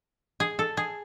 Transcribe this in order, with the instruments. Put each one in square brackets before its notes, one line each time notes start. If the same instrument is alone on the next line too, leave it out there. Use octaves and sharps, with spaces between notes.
[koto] G#4
A4
G#4